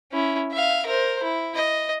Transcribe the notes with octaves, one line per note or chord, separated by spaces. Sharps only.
C#4 E4
E5 F5
A#4 C5
E4
D#5